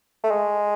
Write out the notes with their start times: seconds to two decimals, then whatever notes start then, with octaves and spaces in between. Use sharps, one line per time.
0.24 A3
0.31 G#3